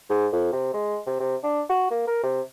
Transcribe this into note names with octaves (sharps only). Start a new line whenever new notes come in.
G#2
F2
C3
G#3
C3
C3
D4
F#4
A#3
A#4
C3